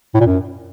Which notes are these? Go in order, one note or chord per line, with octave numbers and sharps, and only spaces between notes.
A2
A#2
F#2